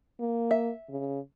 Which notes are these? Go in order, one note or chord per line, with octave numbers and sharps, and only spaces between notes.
A#3
E5
C#3